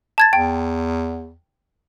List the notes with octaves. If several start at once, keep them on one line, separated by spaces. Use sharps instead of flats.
A5 G#6 A6
E2 G5